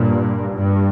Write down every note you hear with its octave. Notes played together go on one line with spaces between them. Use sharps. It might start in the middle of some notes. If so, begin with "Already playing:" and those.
Already playing: G2 A#2
G2